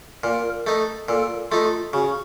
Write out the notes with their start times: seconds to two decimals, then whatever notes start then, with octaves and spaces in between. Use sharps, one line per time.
0.24 A#2 A#4
0.67 A3 D#4
1.09 A#2 A4
1.51 A3 D#4 F4
1.93 C#3 F#4